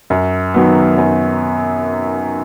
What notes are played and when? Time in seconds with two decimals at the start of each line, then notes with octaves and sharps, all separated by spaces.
0.10 F#2
0.54 D#3 F#3 B3
0.98 F#2